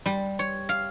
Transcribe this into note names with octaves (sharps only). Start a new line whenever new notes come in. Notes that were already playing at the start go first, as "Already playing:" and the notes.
G3
C#5
F5